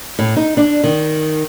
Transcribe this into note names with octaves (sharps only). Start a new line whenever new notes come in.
A2
D#4
D4
D#3